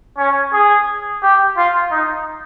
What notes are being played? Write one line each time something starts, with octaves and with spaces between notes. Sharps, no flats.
C#4
G#4
G4
F4
D#4